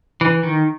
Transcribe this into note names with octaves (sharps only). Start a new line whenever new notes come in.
E3
D#3